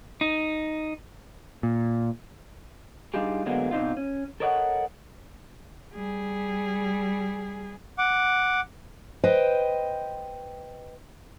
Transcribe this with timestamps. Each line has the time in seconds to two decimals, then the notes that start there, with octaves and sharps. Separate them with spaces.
0.21 D#4
1.63 A#2
3.14 G3 D4 D#4 F4 G4 G#4
3.46 D3 F#3 G#3 A#3 B3
3.71 B2 C4 D4 D#4 F4
3.97 C#4
4.40 A4 A#4 C#5 D#5 F5 F#5
5.94 G3 G#4
7.98 F#5 D6
9.24 B4 C5 D#5 G5